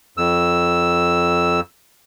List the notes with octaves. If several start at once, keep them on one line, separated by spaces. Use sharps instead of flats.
F2 E6